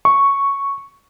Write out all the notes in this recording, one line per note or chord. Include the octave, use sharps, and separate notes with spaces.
C#6